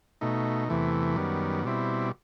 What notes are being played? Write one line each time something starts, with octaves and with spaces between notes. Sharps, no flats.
B2 A3 D#4
E2 C3 E3 A3
F#2 D#3 G3 B3
B2 G3 C4 E4